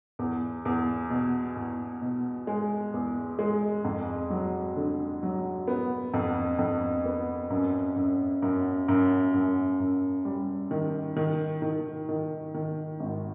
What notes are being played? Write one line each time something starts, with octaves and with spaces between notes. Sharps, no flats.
E2
E2
B2
E2
B2
G#3
E2
G#3
F2
F#3
D3
F#3
B3
F2
F2
B3
F#2
F#2
F#2
F#2
F#2
F#2
G3
D#3
D#3
D#3
D#3
D#3
G#1